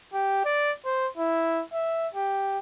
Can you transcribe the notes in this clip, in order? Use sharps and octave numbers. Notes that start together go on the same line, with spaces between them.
G4
D5
C5
E4
E5
G4